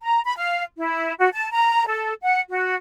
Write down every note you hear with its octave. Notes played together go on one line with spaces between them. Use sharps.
A#5
B5
F5
E4
F#4
A5
A#5
A4
F#5
F#4